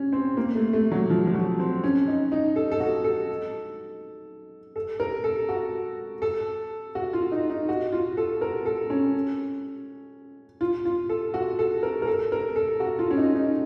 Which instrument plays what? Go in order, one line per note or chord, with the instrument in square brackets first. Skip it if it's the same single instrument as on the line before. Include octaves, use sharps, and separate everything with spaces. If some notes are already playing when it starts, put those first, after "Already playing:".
Already playing: [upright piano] C#4
C4
A#3
A3
A3
F#3
F3
F3
F#3
C4
C#4
D#4
D#4
A4
A4
F#4
A4
A4
A#4
A4
F#4
A4
F#4
F4
D#4
D#4
F#4
F4
A4
A#4
A4
C#4
F4
F4
A4
F#4
A4
A#4
A#4
A4
A#4
A4
F#4
F4
C#4
D#4
D#4